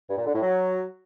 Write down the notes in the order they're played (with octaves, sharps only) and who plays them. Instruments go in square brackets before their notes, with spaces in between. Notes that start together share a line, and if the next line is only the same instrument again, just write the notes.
[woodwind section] G2
A#2
D3
A2
F#3